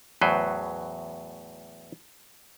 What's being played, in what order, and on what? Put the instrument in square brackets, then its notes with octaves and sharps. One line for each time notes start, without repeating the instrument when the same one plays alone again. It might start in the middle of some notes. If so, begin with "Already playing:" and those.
[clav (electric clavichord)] E2 A2 F#3 B4 C5